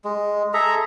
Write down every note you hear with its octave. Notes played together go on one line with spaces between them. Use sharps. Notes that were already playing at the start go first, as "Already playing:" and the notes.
G#3
G#4 A4 E5 A#5